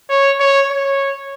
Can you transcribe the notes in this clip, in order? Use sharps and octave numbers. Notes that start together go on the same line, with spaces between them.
C#5
C#5
C#5